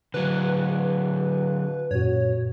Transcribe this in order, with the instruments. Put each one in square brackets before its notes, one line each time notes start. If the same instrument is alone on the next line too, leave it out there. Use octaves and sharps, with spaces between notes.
[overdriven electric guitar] D3 F#3 [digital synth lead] B4
[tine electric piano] F#2 A#2 F#4 [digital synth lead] C#5